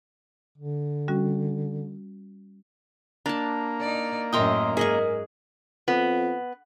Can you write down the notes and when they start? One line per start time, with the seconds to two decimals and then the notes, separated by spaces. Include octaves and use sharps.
0.58 D3
1.08 G3 C#4 F#4
3.26 A#3 D4 A5 A#5
3.80 D#4 D5
4.33 F#2 A2 A#4 D#5 E5 G5 C6 D#6
4.77 G#2 G#4 A#4 D#5 C#6
5.88 F2 B3